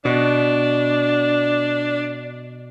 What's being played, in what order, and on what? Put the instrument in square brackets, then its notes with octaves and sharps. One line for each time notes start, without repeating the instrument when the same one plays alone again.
[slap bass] B2 [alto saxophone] D4